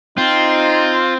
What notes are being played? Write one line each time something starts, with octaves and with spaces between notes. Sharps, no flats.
C4 D#4 F4